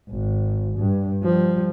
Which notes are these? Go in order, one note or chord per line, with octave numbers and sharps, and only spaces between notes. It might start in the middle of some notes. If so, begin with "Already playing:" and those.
G#1
G2
F3 G3